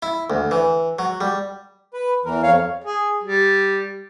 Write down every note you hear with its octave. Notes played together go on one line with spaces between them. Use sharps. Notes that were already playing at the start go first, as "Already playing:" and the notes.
E4
D2
E3
F#3
G3
B4
E2 E3 A#4
F2 C#5 F5
G#4
G3